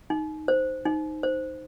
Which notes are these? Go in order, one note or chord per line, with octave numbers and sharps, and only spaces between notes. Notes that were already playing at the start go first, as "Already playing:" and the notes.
D#4
C5
D#4
C5